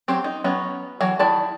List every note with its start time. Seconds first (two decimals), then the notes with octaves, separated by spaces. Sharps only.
0.08 F#3 C4 G4
0.24 D#4
0.44 F#3 B3 C#4
1.01 E3 F#3
1.19 D#3 E4 D5 A5